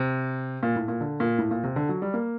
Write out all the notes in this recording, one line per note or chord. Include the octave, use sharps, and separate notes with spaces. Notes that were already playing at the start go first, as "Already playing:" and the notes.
Already playing: C3
A#2
A2
A#2
D3
A#2
A2
A#2
C3
D3
F#3
G3
A#3